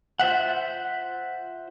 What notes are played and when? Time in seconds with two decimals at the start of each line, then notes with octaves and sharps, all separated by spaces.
0.19 F4 C5 E5 F#5